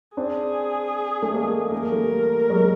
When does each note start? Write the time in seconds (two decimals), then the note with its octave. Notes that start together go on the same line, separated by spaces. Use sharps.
0.17 C4 D4 G#4
1.22 A3
1.34 G#3 A#3
1.72 A3 A#4
1.82 A#3
1.92 G3 A3
2.50 F#3 G#3